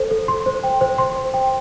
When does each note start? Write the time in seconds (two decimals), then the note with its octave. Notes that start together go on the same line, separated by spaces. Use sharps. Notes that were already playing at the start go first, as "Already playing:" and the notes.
Already playing: A4 C5
0.11 A4
0.28 C6
0.46 C5
0.63 G5
0.81 C5
0.98 C6
1.16 C5
1.34 G5